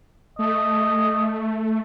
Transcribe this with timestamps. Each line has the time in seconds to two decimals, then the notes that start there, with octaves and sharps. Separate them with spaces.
0.39 A3 D#5